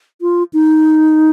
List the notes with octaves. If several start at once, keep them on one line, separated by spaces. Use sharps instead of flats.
F4
D#4